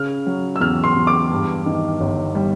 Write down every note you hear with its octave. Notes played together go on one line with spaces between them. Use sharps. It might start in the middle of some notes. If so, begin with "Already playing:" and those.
Already playing: C#3 F6
F#3
E6
E2 F6
C6
E2
D6
G2
D#3
G1
G3